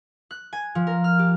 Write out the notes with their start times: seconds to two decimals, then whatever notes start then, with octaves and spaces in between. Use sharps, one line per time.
0.31 F#6
0.53 G#5
0.75 F3
0.87 A#4
1.04 F6
1.19 G4